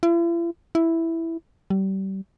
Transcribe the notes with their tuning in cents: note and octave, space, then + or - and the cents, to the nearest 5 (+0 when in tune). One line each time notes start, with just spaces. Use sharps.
E4 +45
E4 +0
G3 -30